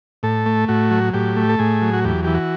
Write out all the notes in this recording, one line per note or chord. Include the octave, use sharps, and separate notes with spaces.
A2 A4
A3
A2 F#4
F#3
A2 G4
A3
A4
A2 G#4
F#3
F#4
E2 G4
E3 G4
F#4